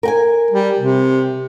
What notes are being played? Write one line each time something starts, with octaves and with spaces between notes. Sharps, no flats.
A#4 G5 G#5
G3
C3